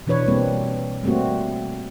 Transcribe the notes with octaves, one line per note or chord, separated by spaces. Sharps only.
B2 E3 D4 B4 C#5
G3 A#3 C4
G3 A3 A#3 C4 F#4